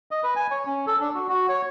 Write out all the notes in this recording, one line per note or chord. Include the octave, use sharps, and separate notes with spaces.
D#5
B4
G#5
C#5
C#4
A4
D4
F#4
F#4
C#5